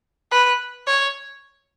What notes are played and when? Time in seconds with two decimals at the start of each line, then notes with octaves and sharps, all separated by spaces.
0.32 B4
0.87 C#5